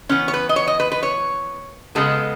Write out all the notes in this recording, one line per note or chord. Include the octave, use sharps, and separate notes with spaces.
E3 B3 C#4
C#5
B4
D#5
C#5
D#5
B4
B4
C#5
C#3 G#3 B3 A4